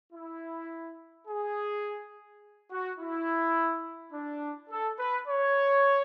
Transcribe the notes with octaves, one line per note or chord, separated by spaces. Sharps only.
E4
G#4
F#4
E4
D4
A4
B4
C#5